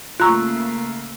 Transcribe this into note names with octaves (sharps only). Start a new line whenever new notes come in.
C#3 A3 A#3 F4 A#5 C#6 E6 F#6